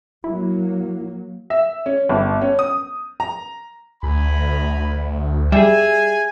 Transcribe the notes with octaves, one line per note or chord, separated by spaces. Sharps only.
F#3 A#3 E4
E5
C#4
G1
C#4
D#6
A#5
D2 G#5 A#5 B5
G3 G#4 E5 G#5